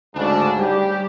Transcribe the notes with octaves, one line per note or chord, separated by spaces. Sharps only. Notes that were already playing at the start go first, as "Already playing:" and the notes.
D2 G#2 C#3 D4
G3 G4